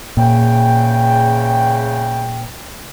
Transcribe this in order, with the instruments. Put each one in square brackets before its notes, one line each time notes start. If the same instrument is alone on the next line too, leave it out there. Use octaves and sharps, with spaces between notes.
[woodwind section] E2 C#3 G5 [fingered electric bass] A#2